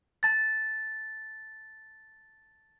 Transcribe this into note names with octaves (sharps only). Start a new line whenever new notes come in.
A5 A6